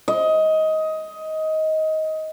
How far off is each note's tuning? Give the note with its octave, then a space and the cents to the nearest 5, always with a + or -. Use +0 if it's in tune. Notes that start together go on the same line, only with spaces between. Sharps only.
D#5 +15